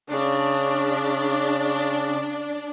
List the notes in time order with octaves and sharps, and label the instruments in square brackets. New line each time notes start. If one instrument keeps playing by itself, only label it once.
[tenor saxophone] C#3 [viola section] D4